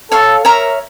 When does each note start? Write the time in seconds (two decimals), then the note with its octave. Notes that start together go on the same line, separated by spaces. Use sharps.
0.11 A4 C#5 F5 C#6
0.44 A#4 C#5 E5 A#5 C#6